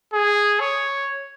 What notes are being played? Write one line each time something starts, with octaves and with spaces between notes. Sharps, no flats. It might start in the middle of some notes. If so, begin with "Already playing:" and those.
G#4
C#5